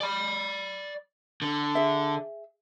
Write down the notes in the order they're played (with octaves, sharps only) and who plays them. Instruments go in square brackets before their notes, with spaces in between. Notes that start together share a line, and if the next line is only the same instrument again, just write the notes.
[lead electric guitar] D5 B5
D3
[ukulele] G#4 E5